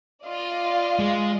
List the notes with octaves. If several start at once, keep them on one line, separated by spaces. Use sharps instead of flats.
F4 D5 D#5
G#3